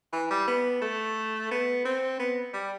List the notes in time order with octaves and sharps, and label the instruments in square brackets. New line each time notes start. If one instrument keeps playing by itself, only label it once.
[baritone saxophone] E3
G3
B3
A3
B3
C4
B3
G3